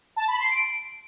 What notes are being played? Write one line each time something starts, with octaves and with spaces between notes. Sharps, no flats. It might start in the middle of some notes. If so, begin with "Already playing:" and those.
A5
B5
C6
D7